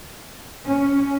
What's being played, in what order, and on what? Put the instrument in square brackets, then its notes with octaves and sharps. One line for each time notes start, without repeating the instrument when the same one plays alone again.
[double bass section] C#4